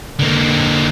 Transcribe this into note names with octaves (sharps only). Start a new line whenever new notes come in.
D3 A#3